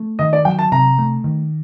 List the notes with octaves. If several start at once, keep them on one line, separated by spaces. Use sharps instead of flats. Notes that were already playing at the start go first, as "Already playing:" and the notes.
Already playing: A3
D#3 D#5
D5
F#3 G5
A5
C3 A#5
A3
D#3